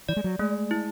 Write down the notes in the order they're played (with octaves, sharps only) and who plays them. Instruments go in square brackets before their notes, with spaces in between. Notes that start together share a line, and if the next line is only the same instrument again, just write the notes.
[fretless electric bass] E3 [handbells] D5
[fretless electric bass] G#3
F#3
[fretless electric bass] G#3 [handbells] A3
[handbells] E4